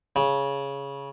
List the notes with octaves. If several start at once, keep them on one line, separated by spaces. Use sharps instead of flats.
C#3